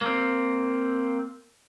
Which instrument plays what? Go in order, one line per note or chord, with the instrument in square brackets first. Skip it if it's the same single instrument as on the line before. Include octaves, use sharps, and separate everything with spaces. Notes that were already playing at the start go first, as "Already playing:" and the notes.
[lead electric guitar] A#3 C4